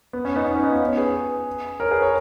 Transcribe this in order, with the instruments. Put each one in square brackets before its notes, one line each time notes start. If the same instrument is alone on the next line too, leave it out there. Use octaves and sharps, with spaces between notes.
[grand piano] B3
C#4
B3 D#4
B3 D#4
C#4
B3 D#4
C#4 F4
C#5
G#4 B4
A#4 C#5
G#4 B4
A#4 C#5